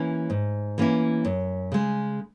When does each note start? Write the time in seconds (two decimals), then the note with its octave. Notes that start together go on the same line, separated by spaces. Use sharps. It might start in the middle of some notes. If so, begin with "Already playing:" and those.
Already playing: E3 A#3 C#4 E4
0.30 G#2
0.78 E3 A#3 C#4 E4
1.25 F#2
1.72 C#3 G#3